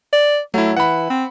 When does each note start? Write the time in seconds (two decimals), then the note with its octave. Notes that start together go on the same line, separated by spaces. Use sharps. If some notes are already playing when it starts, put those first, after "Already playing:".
0.13 D5
0.54 F#3 A3 E4
0.77 E3 F#5 B5
1.10 C4